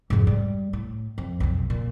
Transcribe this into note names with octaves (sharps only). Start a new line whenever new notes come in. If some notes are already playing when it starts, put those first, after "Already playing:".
F2 G#2
G3
A2
F2
B1 F2
A#2